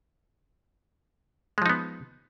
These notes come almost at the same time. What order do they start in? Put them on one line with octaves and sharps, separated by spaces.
G#3 F3 D#4 B3